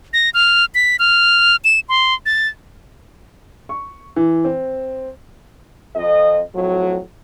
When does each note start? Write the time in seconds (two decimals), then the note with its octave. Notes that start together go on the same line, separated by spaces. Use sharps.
0.13 A#6
0.34 F6
0.75 B6
0.99 F6
1.64 E7
1.89 C6
2.26 A6
3.69 C#6
4.16 E3
4.45 C4
5.96 F2 D#5
6.55 F2 A2 F#3